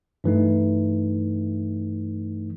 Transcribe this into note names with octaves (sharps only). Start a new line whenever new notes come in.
G2 E3 A3 D#4